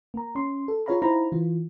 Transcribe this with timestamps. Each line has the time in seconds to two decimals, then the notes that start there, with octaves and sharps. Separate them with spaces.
0.14 A#3 A#5
0.35 C#4 C6
0.68 A4
0.86 F4 G#4 C#5 F5 A#5 B5
1.02 D#4 E4 C5 F5 A#5 B5
1.32 E3 F4